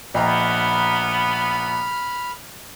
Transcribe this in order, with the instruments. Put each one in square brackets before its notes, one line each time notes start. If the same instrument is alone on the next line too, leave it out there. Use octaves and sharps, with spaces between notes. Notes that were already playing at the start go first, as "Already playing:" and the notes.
[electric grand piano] A#1 [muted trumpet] B3 [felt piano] D#5 G5 A#5 [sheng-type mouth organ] B5 F6